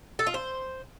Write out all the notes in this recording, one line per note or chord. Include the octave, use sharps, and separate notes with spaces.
A4
F4
C5